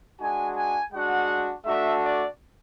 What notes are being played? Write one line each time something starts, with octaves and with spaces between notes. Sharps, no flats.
G#3 D4 F#4 G#5
G#5
G#3 D4 F#4 F#5
A3 D4 F#4 E5
D5